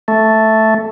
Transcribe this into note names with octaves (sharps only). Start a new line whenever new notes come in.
A3